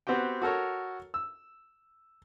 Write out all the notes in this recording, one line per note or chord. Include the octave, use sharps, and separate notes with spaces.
B3 C4 F#4 G4 G5
F#4 A4 A#4 C#5
E6